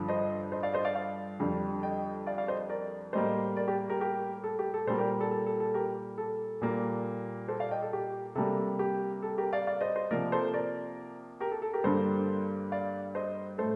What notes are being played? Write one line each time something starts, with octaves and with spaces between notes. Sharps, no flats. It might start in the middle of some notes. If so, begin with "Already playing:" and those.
Already playing: G2 D3 F3
C5 D#5
C5 D#5
D5 F5
C5 D#5
D5 F5
D5 F5
F2 D3 G3
D#5 G5
D5 F5
D5 F5
C5 D#5
A#4 D5
A2 G3 A#3 C5 D#5
A#4 D5
G4 A#4
G4 A#4
G4 A#4
A4
G4
A4
A#2 G3 A#3 A4 C5
G4 A#4
A4
A4
A4
A4
G4 A#4
A4
A#2 G3 A#3
A4 C5
D5 F5
D#5 G5
A4
G4
C3 G3 A#3 A4
G4
A4
G4 A#4
D5 F5
D5 F5
C5 D#5
C5 D#5
C3 F3 A#3 A#4 D5
A4 C5
A#4 D5
G4 A#4
A4
A4
G4 A#4
G2 D3 G3 A#3 A4 C5
D5 F5
C5 D#5
A2 A3 A4 C5